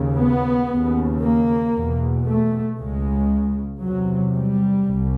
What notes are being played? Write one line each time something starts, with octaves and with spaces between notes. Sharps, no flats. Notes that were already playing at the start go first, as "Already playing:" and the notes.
Already playing: D#2 C#3
B3
D#2 C#3
A#3
E2 B2
A3
C#2 C#3 G#3
E2 C3 F#3
G3
C2